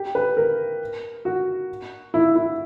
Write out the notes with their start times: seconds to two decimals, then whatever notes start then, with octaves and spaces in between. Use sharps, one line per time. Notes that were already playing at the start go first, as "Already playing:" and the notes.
Already playing: G4
0.15 B4
0.37 A#4
1.25 F#4
2.14 E4
2.35 E4